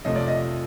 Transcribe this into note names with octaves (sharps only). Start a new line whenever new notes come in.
F2 C3 F3 A3 D#5
D5
D#5